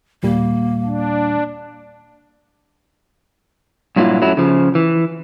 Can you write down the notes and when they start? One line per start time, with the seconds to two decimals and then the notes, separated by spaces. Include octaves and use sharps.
0.23 D#2 A#2 G3 A#3
0.85 D4
3.96 G2 A#2 F#3 A#3 E4 F4
4.21 F#2 F#3 A3 E4
4.37 C#3 F3
4.75 E3